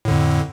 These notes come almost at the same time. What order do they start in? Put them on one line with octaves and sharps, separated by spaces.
A2 D3 F2